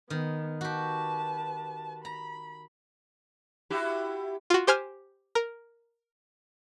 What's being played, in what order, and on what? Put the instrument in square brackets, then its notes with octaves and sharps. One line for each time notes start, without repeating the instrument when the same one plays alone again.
[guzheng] D#3 [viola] B3
[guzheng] F#4 G4 [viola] B4 A5
[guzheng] A#5 [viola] B5
[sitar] E4 F#4 G4
[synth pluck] F4 F#4
G4 C5 G#5 F6
A#4